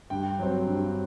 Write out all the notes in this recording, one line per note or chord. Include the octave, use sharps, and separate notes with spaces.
G2 G5
F#3 C4
G2